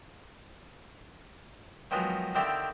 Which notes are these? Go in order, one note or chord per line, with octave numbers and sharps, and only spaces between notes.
D#3 F3 F#3 G#3 B3
D3 D#3 C4 E4 G4 D5